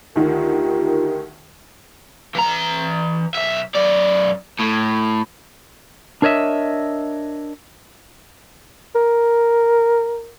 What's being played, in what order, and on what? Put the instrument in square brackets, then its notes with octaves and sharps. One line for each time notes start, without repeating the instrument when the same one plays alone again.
[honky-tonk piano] D2 D#3 [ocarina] F4 [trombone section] G4 A#4
[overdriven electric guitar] E3 A#5
B1 E5
F#2 D5
A2
[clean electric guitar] D4 A#4 C#5 D#5 E5
[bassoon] A#4